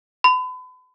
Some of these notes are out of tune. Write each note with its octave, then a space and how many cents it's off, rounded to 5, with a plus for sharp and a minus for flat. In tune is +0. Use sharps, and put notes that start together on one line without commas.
B5 +40